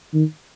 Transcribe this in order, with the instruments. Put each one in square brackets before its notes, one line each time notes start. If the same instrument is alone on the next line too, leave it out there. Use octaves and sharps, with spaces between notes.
[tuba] D#3